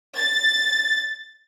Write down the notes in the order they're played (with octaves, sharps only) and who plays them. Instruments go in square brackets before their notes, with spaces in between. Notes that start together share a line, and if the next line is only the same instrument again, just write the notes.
[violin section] A6